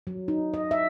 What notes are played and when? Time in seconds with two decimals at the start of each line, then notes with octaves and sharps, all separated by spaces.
0.07 F#3
0.28 D#4
0.54 D#5
0.71 E5